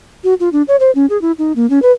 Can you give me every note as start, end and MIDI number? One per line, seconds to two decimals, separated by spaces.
0.24 0.34 66
0.40 0.49 65
0.53 0.62 62
0.68 0.76 73
0.80 0.91 72
0.95 1.06 61
1.10 1.20 68
1.22 1.32 64
1.39 1.52 63
1.56 1.69 58
1.70 1.82 61
1.82 1.92 71